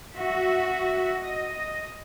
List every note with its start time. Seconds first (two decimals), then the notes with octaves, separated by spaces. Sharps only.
0.16 F#4 E5
1.21 D#5